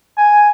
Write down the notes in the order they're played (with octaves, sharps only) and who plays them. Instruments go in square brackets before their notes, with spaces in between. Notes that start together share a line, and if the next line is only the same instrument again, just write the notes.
[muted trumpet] G#5